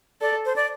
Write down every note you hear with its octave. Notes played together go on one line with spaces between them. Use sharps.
A4 D5
C5
D5